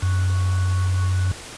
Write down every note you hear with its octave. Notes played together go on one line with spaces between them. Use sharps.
F#2